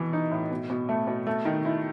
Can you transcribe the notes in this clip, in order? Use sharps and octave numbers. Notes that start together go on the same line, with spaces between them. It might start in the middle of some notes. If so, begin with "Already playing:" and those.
Already playing: B2 E3 B3
D#4
A2
B2
B2
A3
B2
A3
D#3
E4